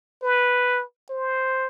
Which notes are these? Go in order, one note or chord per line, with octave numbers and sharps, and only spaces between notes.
B4
C5